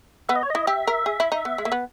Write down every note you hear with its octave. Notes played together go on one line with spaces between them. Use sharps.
B3 E5
D#5
C#5
E4 D#5
G4 E5
A#4
G#4
E4
D#4
B3
G#3
A#3
B3